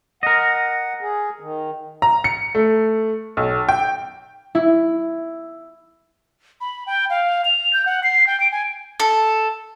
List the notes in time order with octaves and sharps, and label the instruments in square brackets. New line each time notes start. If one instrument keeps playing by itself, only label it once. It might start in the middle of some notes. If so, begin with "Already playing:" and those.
[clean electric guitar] A#4 D#5 [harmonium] F#5
[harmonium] G#4
D#3
[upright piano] A#5
C#7
A3
B1
G5
[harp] E4
[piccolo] B5
G5
F5
F7
G6
F#5
C7
G5
D7
G#5
[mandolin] A4